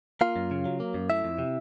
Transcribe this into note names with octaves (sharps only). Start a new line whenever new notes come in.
A#3 F4 F5
F#2
C#3
F#3
A#3
F#2
A3 E4 E5
F2
C3